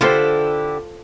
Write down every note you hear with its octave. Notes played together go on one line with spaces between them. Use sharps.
D3 E4 F4 G4 A4 C5